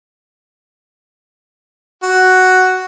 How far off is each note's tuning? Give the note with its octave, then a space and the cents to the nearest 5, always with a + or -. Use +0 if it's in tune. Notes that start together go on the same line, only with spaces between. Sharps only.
F#4 +5